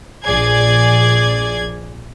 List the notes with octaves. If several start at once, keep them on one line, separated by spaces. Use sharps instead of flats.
A#1 G#4 D5 G#6